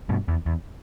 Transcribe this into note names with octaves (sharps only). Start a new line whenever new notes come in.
G2 B2
E2
E2